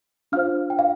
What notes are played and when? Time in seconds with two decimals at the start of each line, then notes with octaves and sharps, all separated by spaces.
0.32 D4 F4 C5 F5 F6
0.70 G5
0.79 F5